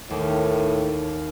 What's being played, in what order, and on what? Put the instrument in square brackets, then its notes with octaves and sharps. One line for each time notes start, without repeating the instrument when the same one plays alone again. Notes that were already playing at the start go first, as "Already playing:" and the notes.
[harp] D#2 [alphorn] A2